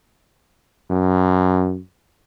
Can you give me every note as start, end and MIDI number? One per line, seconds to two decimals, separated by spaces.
0.90 1.79 42